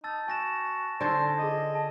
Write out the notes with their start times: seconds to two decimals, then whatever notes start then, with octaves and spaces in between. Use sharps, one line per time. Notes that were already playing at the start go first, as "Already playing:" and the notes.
0.04 D#4 A5 E6 A6
0.28 F#4 G#5 A#6 E7
1.01 D3 D#4 A4 C5 D5 G#6 A#6 D7
1.39 F4 G#4 D#5
1.75 A5